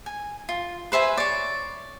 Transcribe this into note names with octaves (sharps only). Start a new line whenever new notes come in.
G#5
F4
B4 C5 E5 G#5
C#5 D5